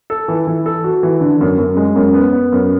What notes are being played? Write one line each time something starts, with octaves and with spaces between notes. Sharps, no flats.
A4
E3
E3
A4
F#4
E3
D3
F#2
F#2
G#3
F#2
B3
B3
F#2